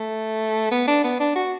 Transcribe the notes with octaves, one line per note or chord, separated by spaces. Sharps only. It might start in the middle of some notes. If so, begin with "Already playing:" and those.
Already playing: A3
B3
D4
B3
D4
F#4